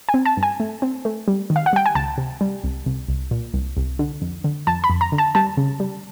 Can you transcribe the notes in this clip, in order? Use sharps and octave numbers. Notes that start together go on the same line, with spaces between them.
G#5
C4
A5
G2
G#5
A3
C4
A3
G3
D#3
F5
F#5
G3 G5
G#5
C#2 A5
C3
G3
C2
C2
C2
A#2
C2
C2
D3
F2
D3
F2 A5
B5
F2
A#5
D3
A5
G3 A5
C#3
G3